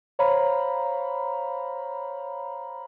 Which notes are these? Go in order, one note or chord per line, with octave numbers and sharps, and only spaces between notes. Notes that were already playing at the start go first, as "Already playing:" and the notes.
C5 C#5 F5 A#5 B5